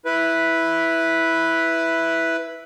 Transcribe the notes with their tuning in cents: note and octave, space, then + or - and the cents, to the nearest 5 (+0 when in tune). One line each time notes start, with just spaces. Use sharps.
E4 +0 B4 +0